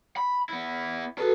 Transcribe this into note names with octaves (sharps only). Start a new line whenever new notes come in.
B5
B3 E4
F#4 G#4 A4 B4 A5